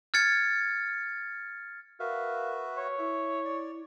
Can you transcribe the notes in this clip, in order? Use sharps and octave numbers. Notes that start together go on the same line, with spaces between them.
F6 G#6 A6 C#7
F#4 A#4 B4 E5 F5
C#5
E4 E5
D5